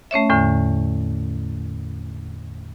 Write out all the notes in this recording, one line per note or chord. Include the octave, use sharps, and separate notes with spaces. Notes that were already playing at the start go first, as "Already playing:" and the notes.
A3 C#4 C#5 E5
E2 A2 D3